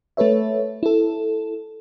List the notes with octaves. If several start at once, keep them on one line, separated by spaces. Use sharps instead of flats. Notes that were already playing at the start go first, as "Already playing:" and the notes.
A3 A4 B4 C#5 E5
E4 A4